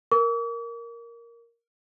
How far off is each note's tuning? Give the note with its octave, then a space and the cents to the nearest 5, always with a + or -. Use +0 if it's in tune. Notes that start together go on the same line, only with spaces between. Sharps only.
A#4 +0 D6 -45